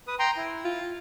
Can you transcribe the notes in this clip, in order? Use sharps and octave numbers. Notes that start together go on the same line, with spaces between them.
B4 D#6
G5 A#5 C6
E4
F4